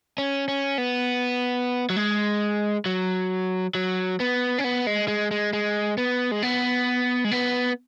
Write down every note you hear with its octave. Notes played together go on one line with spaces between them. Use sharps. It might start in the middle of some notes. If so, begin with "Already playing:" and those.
C#4
C#4
B3
F#3
G#3
F#3
F#3
B3
C#4
B3
G#3
G#3
G#3
G#3
B3
G#3
B3
G#3
B3